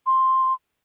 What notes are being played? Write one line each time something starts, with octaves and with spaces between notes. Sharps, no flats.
C6